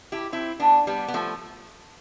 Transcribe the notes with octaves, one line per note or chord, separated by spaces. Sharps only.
E4 G4
C4 E4
B3 D4
G3 B3
B3
F3 A3